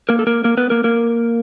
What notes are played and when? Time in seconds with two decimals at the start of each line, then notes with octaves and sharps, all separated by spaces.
0.09 A#3 A#4
0.19 A4
0.27 A#3 A#4
0.44 A#3 A#4
0.57 B3 B4
0.70 A#3 A#4
0.84 A#3 A#4